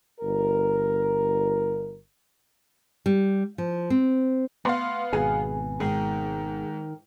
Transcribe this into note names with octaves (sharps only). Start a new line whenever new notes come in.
G1 A#4
G3
F3
C4
A3 B3 F5 C6
G#1 B2 G#4 B4 G#5
G#2 D#3 G#4